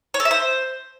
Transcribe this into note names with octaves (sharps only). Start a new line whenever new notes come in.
C#5
A4
E5
C5